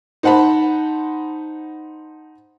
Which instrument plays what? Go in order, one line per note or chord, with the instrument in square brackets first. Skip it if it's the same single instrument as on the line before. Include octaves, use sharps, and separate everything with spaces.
[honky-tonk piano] D#4 C5 F#5 A5 B5